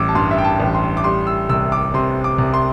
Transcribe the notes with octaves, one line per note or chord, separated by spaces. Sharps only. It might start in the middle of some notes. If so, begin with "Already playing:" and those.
Already playing: A1 G3 D6 E6
A5
G2 C6
E5
G5
A5
A1
C6
D6
G3 C6
E6
C2 E6
D6
C3 C6
D6
C2
C6